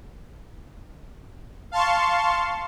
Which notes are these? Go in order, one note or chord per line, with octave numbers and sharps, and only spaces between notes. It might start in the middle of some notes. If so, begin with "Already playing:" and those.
F5 A5 C6 C#6